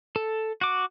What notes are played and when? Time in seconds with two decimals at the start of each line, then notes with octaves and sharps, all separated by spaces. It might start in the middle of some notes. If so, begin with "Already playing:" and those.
0.16 A4
0.61 F#4 D6